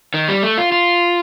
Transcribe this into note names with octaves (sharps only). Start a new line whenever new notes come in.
D#3
G3
A3
F4
F4